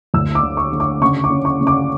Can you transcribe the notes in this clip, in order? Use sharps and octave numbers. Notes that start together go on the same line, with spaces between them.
D2 E6
D6
D3
C#6
D3
D6
C#3 C#6
D6
C#4
C#6
C#3
D6